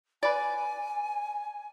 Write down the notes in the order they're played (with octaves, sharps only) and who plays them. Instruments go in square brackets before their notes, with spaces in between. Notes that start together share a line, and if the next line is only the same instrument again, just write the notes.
[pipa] B4 D5 [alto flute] G#5